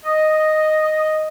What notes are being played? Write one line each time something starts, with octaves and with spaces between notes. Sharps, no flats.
D#5